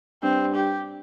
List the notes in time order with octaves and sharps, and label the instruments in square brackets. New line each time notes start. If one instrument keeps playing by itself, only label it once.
[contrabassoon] G2 [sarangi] C4
[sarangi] G4